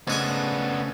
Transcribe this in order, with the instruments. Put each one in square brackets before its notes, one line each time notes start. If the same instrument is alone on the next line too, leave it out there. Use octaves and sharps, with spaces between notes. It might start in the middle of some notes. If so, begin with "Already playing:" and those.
[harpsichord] G#2 G#4 G#5 [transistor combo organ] C#3 A3 [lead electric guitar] B3 D4